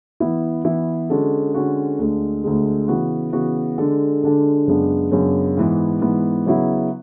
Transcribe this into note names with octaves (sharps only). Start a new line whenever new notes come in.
E3 B3 E4
E3 B3 E4
D3 G#3 C#4 F#4 A4
D3 G#3 C#4 F#4 A4
D2 D3 G#3
D2 D3 G#3
C#3 E3 B3 F#4
C#3 E3 B3 F#4
D3 G#3 D4 A4
D3 G#3 D4 A4
F#2 C#3 G#3 B3 D4
F#2 C#3 G#3 B3 D4
G#2 E3 B3
G#2 E3 B3
C#3 F#3 B3 E4